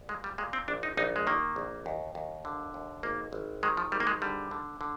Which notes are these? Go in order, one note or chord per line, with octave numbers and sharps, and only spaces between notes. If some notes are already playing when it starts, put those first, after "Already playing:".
Already playing: C2
A#2 G#3
G3
A#2 G#3
C4
A#1 D4
D#4
A#1 D#4
G#3
D#3 A#3
A#1
D#2
D#2
D3
D#2
G#1 A#3
G#1
D#3 G#3
F3
G#1 G3
A#3
G#3
D3 G3
D3
D3